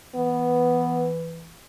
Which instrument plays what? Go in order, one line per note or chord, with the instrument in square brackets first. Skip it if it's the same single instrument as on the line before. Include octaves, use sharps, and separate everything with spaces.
[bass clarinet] E3 [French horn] B3